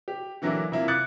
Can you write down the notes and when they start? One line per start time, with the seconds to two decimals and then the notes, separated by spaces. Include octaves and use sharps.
0.08 G4
0.42 D3 E3 F#3 A#3 D4 E4
0.72 C3 A#3 E4 F4
0.88 D6 D#6 F#6 G#6 A6 C#7